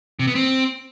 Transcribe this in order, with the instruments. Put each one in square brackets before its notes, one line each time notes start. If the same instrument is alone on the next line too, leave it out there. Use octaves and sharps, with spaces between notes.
[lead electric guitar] C3
B3
C4